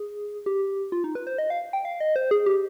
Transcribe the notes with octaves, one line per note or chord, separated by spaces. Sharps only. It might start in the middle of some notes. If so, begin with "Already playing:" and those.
Already playing: G#4
G4
F4
D#4
B4
C5
D#5
F5
G5
F5
D#5
C5
G#4
G4